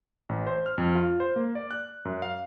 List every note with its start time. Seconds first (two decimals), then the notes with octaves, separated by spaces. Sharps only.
0.29 A1
0.47 C5
0.66 F6
0.78 F2
0.95 F4
1.20 C5
1.36 A#3
1.55 D5
1.71 F#6
2.05 F#2
2.22 F5